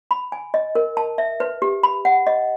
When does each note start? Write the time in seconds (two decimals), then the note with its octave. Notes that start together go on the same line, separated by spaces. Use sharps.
0.11 B5
0.32 G#5
0.54 D#5
0.75 A#4
0.97 A5
1.18 E5
1.40 B4
1.62 G4
1.83 B5
2.05 F#5
2.27 D#5